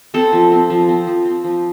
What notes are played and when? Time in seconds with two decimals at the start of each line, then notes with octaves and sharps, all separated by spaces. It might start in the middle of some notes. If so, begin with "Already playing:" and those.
0.14 C4 A4
0.33 F3
0.52 C4
0.70 F3
0.89 C4
1.07 F3
1.25 C4
1.44 F3